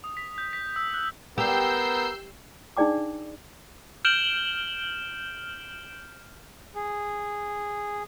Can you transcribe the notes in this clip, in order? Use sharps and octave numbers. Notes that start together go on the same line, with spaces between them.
D#6
B6
G6
B6
E6
F#6
B3 G4 A#4 E6 G6 C7
D4 D#4 G#4 D5 G5 D6
F6 G6 D7 E7 F#7 G7
G#4